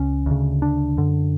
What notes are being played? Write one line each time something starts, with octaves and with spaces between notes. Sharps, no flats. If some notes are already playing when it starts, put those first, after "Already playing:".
Already playing: C#2 C#3 C#4
D2 C#3
D4
F#2 D3